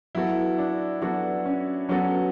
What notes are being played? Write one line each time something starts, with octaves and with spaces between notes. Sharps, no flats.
F#3 B3 E4 F#4 A4
D4
F#3 B3 D4 F#4 A4
C#4
F#3 B3 C#4 F#4 A4